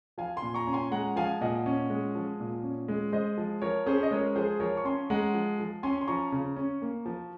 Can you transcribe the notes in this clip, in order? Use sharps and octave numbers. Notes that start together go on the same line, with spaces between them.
F3 F5 G#5
G#5 C6
A#2
A#5 C#6
C#4
G#5 C6
G#3 F#5 A#5
F3 F5 G#5
A#2 D#5 F#5
C#4
G#3
F3
A#2
C#4
G#3
G#3 C5 D#5
F3
F3 A#4 C#5
C#4 G#4 C5
D#5
G#3 A#4 C#5
F3 G#4 C5
F3 A#4 C#5
C#6
C#4 G#5 C6
G#3 F#5 A#5
F3
F3
C#4 G#5 C6
C6
F3 A#5 C#6
C#3
C#4
A#3
F3